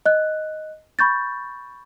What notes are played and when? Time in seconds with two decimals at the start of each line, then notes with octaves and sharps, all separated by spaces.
0.06 D#5 F#6
0.99 B5 C#6 G6 A6